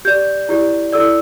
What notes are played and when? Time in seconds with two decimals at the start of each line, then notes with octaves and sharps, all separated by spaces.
0.05 G4 D5 G6
0.49 E4 G4 D5
0.93 E4 A4 D5 E6